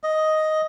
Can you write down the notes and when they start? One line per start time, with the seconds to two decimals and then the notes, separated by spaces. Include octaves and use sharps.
0.03 D#5